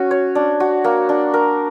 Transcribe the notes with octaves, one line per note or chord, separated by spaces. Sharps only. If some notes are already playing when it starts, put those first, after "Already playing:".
Already playing: C#4 F#4
C#5
D4
F#4
A#3
D4
A#4